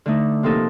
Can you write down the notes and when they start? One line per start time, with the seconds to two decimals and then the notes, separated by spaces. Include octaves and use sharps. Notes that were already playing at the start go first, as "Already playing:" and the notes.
0.06 D3 A3 D#4
0.43 C3 F3 A#3 D#4 A4